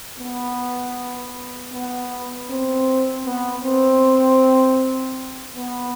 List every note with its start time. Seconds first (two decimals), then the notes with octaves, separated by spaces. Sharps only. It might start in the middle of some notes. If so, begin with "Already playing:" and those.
0.19 B3
1.73 B3
2.50 C4
3.25 B3
3.64 C4
5.56 B3